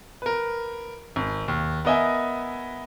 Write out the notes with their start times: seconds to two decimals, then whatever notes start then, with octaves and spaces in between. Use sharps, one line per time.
0.22 A#4 B4
1.16 G#1
1.48 D#2
1.85 B3 A#4 D#5 E5 G#5